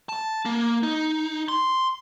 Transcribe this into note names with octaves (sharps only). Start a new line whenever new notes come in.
A5
A#3
D#4
C6